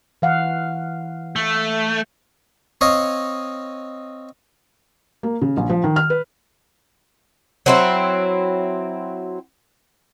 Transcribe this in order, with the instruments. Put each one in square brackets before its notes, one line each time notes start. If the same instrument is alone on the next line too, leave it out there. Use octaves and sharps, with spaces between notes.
[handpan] E3 F5 F#5
[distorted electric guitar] A3
[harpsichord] C4 C#5 D#5 F5
[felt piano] A#3
C#3
A#1
F3
D#3
F6
B4
[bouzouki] F#3 C4 E4